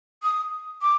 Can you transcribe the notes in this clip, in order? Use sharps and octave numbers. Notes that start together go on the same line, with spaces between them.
D#6
D6